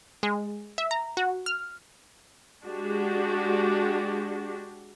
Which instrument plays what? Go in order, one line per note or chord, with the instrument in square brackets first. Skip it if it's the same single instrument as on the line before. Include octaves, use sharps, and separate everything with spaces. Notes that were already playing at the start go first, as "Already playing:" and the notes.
[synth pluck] G#3
E5
A#5
F#4
F6
[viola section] G#3 D4 F#4 G4